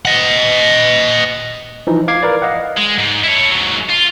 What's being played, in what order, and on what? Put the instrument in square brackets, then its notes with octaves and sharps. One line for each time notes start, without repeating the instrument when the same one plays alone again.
[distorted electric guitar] D#5 F#5
[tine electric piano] E3 F3 D#4
F5 D6 G#6 C7
A#4 B4 D5
D#5 F5 F#5
[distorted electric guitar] G#3
G#2
E4 C#5
G#2 F#3
F4